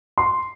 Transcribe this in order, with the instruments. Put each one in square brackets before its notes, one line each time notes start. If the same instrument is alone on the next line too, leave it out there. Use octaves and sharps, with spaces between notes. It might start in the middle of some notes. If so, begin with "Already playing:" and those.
[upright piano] C6